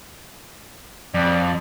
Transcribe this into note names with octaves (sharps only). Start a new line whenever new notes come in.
F2 D5